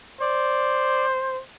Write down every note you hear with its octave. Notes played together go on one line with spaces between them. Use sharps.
C5 D5